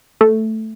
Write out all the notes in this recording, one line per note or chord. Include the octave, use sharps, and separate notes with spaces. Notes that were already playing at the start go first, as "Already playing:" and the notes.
A3